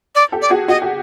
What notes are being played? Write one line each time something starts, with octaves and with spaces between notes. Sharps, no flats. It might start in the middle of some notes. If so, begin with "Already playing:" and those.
D5
G4 A4
D5
F#4 G#4
F#4 D#5
G4